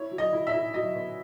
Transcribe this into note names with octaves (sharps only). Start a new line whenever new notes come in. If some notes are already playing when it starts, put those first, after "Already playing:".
Already playing: E4 C#5
F#3
D#5
E4
E5
E4
F#3 D#5
B3